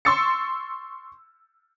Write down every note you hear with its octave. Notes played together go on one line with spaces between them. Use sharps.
C6 C#6 E6 A6 C#7